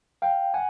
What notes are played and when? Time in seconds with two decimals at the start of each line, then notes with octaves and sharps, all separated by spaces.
0.22 F5 G5
0.54 F#5 G#5